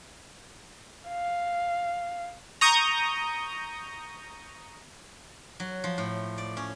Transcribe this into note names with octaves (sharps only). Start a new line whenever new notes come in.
F5
A#5 C#6 D#6 G6
F#3
F3
A2
D5
C#4